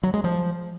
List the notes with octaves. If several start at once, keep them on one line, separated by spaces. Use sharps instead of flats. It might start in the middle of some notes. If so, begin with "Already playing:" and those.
F#3
G#3
F3